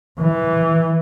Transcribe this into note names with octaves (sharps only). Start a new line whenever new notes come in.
E3